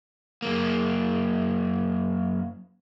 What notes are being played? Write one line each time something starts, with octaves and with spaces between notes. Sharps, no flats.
F#2 A#3